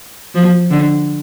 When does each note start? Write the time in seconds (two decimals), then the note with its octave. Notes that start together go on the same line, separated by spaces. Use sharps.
0.35 F3
0.70 D3